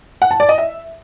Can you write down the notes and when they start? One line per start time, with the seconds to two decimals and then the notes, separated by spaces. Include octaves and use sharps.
0.22 F#5
0.31 A5
0.40 D5
0.49 D#5
0.58 E5